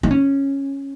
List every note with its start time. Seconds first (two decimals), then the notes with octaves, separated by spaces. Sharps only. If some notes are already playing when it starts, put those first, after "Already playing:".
0.03 D#4
0.11 C#4